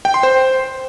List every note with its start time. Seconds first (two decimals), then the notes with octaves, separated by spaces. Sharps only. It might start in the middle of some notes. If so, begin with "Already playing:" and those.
0.05 G5
0.14 C6
0.23 C5